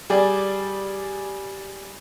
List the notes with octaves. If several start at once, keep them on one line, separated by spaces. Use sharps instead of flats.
G3 G#4 D5